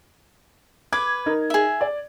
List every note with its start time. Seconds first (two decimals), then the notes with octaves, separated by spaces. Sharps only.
0.93 B4 D6 G#6
1.26 D#4 A#4
1.50 G#4 E5
1.81 D5